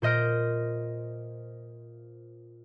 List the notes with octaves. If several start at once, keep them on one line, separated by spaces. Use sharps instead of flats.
A#2 C5 D#5 F6 D7